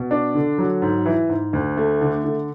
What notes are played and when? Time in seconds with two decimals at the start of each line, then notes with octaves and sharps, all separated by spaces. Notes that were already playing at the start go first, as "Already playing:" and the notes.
Already playing: B2
0.11 D4
0.35 D3
0.58 F#3
0.82 G#2
1.06 E3
1.29 G#2
1.53 D2
1.77 A3
2.01 D3
2.24 D3